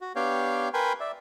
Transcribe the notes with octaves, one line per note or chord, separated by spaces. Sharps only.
F#4
B3 D4 G4 C#5 F5 G5
A#4 B4 G5 G#5 B5 C6
D5 E5